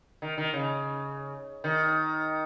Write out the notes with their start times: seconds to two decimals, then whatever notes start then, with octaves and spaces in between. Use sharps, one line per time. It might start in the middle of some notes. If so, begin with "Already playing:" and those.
0.22 D#3
0.38 D#3
0.53 C#3
1.64 D#3